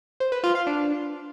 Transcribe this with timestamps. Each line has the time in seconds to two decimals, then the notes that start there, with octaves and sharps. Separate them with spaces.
0.20 C5
0.32 B4
0.44 F4
0.55 F5
0.67 D4